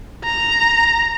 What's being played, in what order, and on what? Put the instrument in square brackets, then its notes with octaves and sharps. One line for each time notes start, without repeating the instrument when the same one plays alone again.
[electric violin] A#5